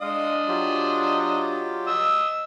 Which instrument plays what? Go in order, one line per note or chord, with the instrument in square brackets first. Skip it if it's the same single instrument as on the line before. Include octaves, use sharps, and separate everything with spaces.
[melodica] G#3 F5 D#6 [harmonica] D4 D#5
[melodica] F#3 F4 G4
[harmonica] D#5 E6